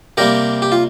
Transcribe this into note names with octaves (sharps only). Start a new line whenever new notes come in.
C3 G3 A#3 G4 A#4
G4
F4